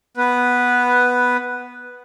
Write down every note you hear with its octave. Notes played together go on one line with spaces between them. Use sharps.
B3 B4